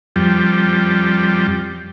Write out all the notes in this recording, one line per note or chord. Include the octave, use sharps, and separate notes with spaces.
F2 G3